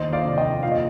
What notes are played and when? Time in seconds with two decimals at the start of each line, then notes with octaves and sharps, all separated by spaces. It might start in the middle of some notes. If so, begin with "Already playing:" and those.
Already playing: G1 D#2 C5 D#5
0.12 D5 F5
0.25 F1
0.38 D#5 G5
0.63 A#2 F5
0.72 D#5